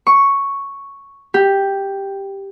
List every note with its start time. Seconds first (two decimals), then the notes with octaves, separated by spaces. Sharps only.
0.07 C#6
1.34 G4